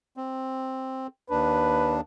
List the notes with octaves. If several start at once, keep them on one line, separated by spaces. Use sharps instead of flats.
C4
D#2 D4 B4